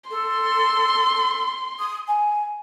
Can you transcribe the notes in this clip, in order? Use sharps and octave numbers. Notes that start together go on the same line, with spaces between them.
A4 C6
D#6
G#5